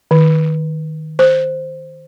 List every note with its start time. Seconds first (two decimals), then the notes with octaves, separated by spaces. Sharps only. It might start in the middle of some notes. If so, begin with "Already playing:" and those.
0.11 D#3
1.19 C5